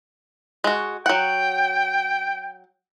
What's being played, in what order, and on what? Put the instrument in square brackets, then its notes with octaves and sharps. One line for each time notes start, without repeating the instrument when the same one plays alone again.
[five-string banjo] G#3 F#4
[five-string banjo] F#3 F#5 [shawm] G5